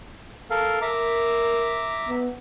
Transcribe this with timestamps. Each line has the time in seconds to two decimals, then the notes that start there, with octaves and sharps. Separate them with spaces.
0.50 A4 A#4 F5
0.82 A#4 E5 A#5 D6
2.08 B3